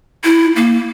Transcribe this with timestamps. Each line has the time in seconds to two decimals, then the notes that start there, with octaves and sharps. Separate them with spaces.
0.24 E4
0.56 A#3